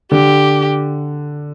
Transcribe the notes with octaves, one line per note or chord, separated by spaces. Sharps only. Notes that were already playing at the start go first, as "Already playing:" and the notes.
D3 G4